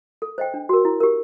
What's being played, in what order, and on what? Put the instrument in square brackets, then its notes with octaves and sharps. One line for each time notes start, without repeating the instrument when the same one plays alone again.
[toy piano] A4
C5 D#5 G5
D4
F#4 A#4
E4
G4 A#4